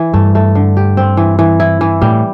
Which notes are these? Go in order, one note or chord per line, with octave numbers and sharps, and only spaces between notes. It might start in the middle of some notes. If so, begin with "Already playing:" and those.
Already playing: E3
G2 A3
A3
D3
G4
C4
E3
E3
E4
E3
A2 G3